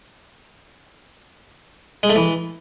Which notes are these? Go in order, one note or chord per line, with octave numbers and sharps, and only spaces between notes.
G#3
A3
E3